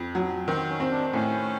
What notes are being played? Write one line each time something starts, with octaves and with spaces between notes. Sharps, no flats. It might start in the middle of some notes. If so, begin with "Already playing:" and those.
Already playing: F2
F#3
D#3 C4
C#4
C4
D4
A2 C#4